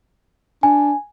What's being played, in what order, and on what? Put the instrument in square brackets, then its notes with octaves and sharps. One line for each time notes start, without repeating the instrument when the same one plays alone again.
[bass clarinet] D4 [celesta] G#5